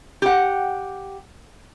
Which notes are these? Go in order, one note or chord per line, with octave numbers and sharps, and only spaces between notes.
G4 F#5